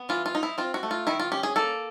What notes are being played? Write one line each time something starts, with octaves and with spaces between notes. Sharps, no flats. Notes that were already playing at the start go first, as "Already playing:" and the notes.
Already playing: B3
E3 F4
F4
D#4
E4
C4 F4
F#4
A3
F4
D#3 E4
F4
C#4 G4
G#4
A#3 A4